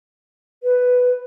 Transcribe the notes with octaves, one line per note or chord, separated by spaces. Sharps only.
B4